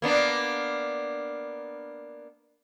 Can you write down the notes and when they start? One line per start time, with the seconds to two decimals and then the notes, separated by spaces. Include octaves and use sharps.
0.02 A#3 B3 D4